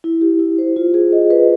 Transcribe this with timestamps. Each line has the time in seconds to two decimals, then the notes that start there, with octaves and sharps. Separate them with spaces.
0.04 E4
0.21 G4
0.39 E4
0.58 C5
0.76 F4
0.94 G#4
1.12 D#5
1.30 B4